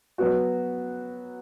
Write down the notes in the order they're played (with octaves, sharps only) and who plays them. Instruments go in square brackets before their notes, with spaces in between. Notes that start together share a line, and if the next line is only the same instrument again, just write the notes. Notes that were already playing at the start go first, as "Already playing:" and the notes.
[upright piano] F#3 B3 F#4